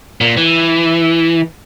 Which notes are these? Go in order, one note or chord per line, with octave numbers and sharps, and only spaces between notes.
A#2
E3